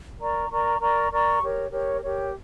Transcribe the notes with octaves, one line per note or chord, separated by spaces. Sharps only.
A#4 D5 A#5 C#6
A#4 D5 A#5 C#6
A#4 D5 A#5 C#6
A#4 D5 A#5 C#6
G4 A#4 C#5
G4 A#4 C#5
G4 A#4 C#5